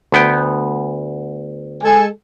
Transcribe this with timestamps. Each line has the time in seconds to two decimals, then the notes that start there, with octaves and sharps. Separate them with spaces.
0.12 D2 B3 G5
1.83 G#3 A4 G#5